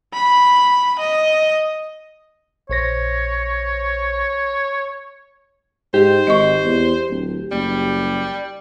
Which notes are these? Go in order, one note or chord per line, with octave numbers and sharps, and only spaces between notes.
B5
D#5
A#1 C5 C#5 A#6
G#2 G4 C5
G#1 D#5 C#6
E2
D1
F#1 G3